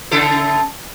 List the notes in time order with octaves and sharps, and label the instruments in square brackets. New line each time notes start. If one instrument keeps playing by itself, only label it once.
[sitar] C#3 E4 A4